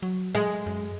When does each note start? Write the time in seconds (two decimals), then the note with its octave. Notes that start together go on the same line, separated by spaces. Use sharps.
0.03 F#3
0.35 G#3
0.66 F#2